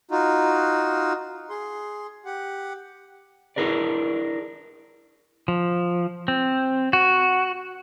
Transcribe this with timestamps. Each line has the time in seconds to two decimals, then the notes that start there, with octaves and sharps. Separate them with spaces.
0.11 D#4 F4 F#4
1.50 G#4 C6
2.25 G4 F#5
3.56 D4 E4 G#4 A#4 B4 D5
5.48 F3
6.28 C4
6.93 F#4